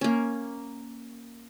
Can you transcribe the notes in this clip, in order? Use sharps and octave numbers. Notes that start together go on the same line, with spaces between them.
A#3 C#4